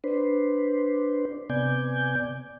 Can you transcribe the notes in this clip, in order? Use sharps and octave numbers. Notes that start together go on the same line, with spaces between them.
D4 B4 C5
C3 B3 D5 G#5 G6